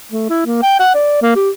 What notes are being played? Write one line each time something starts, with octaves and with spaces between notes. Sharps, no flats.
A3
E4
A#3
G5
F#5
D5
A#3
G4